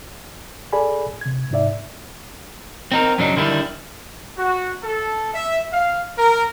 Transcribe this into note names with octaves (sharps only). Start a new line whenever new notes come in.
G#4 A4 D5 G#5 B5
C3 G#6
G#2 C3 D#4 D5 E5
C4 D#4 A#4
F#2 C#3 F#3 D4 D#4
D3 D#3 G3 D4 E4
F#4
A4
E5
F5
A#4